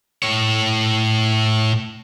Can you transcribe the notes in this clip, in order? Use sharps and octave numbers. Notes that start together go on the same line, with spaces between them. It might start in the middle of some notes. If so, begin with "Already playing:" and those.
A2 C#5